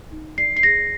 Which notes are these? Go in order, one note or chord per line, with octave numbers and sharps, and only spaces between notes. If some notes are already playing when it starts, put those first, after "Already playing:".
D#4
D5 C7
C7
G#4 A#6